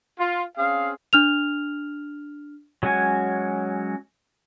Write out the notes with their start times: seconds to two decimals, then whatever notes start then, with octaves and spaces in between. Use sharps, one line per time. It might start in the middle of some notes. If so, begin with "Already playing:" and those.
0.19 F4
0.58 C4 C#4 G#4 F5
1.13 D4 F6 F7
2.83 F#3 G#3 C#4 F#4 G#5